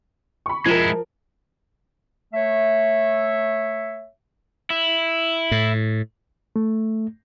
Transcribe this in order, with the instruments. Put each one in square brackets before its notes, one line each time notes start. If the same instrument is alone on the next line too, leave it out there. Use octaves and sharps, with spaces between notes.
[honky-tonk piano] B5 C#6
[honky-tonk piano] F3 A#4 [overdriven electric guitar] G#3 E4
[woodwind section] A3 C#5 E5
[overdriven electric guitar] E4
[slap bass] A2
[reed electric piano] A3